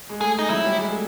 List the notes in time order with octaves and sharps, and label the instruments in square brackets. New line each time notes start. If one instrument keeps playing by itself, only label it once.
[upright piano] G#3
[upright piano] A3 [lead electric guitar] G#4
[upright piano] G#3 [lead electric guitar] D#4
[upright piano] F#3 [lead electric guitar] E4
[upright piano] G3
G#3
A3